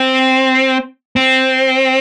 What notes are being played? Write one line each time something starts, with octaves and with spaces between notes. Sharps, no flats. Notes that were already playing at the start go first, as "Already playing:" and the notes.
Already playing: C4
C4